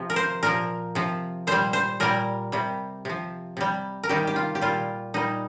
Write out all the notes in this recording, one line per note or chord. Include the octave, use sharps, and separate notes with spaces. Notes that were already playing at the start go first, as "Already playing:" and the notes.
Already playing: C3 F3
A#4
C5
A#2 F3 A#4
C3 F3
A#2 G3 C5
C5
A#2 G3 A#4
C3 G3
C3 F3
C3 G3
A#4
C3 D#3 G3 G4
G4
F4
G4
A#2 G3 F4
A#2 G3 D#4